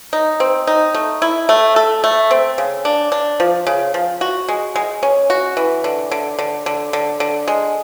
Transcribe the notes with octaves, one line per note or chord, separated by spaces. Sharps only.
D#4
C4
D#4
A3
E4
A3
A4
A3
C4
C#3
D4
D4
F3
C#3
F3
F#4
G#3
G#3
C#4
F#4
E3
D3
D3
D3
D3
D3
D3
G#3